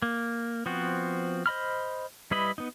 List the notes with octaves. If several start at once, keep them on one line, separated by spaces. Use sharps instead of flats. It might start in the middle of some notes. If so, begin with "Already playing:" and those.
A#3
F3 B3 C4 F#4
C5 D#5 B5 F6
G3 E4 B4 D#5 B5
B3 D#4